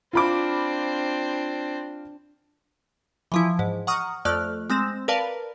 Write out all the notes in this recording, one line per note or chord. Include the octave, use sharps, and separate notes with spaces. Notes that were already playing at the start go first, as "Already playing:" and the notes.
C4 D4 F4 B5 D6
E3 F3 E4
G#2
F#5 A#5 C#6 D#6 F6
F2 A3 D5 F6 F#6
G#3 C4 A#6 E7
A#4 B4 D5 F5 A5